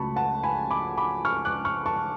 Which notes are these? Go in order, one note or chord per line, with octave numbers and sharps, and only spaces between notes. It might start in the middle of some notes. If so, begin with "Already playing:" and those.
Already playing: C#2 C#3 F#3 A3 A5 B5 C#6
F#5 A5
G#5 B5
B5 D6
B5 D6
C#6 F6
D6 F#6
C#6 F6
A5 C#6